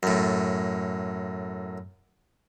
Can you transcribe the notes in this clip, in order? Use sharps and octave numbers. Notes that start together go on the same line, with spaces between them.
F#2 A2